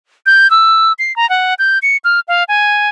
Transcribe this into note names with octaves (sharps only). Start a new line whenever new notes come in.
G6
E6
C7
A#5
F#5
G6
C#7
F6
F5
G#5